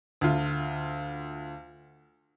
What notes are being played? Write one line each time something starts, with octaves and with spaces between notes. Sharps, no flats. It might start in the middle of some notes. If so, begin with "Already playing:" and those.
D2 F4